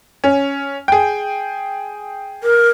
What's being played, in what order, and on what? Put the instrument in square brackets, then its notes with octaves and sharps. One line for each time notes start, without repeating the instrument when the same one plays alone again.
[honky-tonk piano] C#4
G#4 G5
[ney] A#4